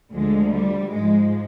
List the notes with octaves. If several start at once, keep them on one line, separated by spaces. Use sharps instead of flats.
D2 D3 F3 G#3
G3
G#2 F3 G#3